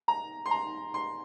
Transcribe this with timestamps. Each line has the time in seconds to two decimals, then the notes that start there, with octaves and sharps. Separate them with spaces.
0.08 A#5
0.46 C6
0.51 A#5
0.94 C6